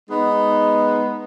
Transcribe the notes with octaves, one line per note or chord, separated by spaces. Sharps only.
G#3 B3 D#4